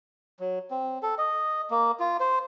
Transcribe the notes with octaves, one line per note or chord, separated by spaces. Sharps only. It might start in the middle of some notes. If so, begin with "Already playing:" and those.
F#3
C4
A4
D#5
A#3
F4
C5